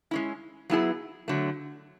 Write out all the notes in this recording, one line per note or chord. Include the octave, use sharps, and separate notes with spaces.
G#3 C#4 E4
F#3 B3 E4 G#4
D3 F#3 A3